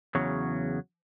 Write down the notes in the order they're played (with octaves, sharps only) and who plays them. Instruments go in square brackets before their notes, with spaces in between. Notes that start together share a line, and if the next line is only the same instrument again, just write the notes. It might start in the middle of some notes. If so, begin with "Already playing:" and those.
[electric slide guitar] E2 C#3 F#3